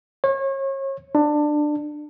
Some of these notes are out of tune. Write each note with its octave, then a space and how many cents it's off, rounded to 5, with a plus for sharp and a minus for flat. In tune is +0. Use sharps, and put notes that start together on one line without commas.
C#5 -35
D4 +20